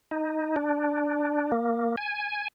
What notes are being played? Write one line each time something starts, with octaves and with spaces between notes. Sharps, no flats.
D#4
D4
A#3
G#5